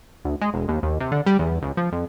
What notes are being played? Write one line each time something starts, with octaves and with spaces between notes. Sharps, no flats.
D2
G#3
E1
D#2
D#2
C3
D3
G3
E2
C#2
F3
F2